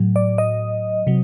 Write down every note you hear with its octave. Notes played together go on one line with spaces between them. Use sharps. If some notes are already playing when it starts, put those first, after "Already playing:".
Already playing: A2 F#3
D5
D#5
C3 F#3